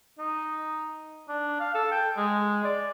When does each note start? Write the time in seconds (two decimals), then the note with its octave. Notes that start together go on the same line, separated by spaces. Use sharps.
0.19 D#4
1.28 D4
1.60 F5
1.74 A4
1.91 G5
2.17 G#3
2.64 D5